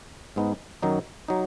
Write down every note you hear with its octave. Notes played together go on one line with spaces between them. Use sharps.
G#2 G#3 B3 D#4
F#2 D#3 F#3 D#4
F#3 D#4